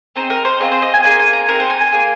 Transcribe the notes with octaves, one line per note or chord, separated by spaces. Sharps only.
C4 D#4 G#4 C5
A#4
C5
C4 F4 G#4 D#5
C5
D#5
G#5
A#3 D#4 G#4 G#5
G#5
A#5
C4 D#4 G#4 A#4
C5
G#5
G#5
A#3 F4 G#4